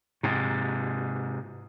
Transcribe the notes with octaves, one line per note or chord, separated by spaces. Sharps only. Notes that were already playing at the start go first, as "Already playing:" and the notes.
G#2 C3